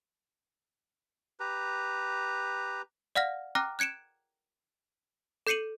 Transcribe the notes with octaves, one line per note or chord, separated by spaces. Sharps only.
G4 B4 A#5
D5 F5 F#5 F6 A#6
G5 A#5 D6 F6 F#6 A#6
F#6 G#6 C#7 D7 E7
A4 G6 C7 C#7 D#7 F#7